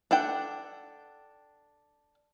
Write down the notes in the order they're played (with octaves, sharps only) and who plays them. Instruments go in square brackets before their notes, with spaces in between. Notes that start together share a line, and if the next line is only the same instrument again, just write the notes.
[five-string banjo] D4 A4 F#5 G5